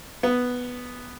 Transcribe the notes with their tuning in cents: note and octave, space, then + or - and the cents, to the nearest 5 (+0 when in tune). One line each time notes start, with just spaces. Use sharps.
B3 +0